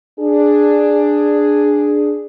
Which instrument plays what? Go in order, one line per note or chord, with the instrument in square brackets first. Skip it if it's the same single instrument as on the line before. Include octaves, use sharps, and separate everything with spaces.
[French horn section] D4 G#4